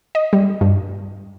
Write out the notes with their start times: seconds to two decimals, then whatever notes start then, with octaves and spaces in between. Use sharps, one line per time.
0.15 D#5
0.33 G3
0.61 G2